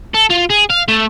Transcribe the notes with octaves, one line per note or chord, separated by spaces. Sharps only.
A4
F4
G#4
F5
A3